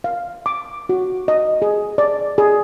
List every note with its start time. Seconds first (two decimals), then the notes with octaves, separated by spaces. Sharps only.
0.04 F5
0.46 D6
0.89 F#4
1.28 D#5
1.62 G#4
1.98 D5
2.38 G#4